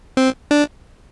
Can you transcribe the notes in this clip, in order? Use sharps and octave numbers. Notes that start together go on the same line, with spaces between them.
C4
D4